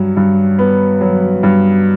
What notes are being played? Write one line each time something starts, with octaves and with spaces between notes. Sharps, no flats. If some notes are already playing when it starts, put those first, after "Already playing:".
Already playing: G2 F#3
G2
B3
F#3
G2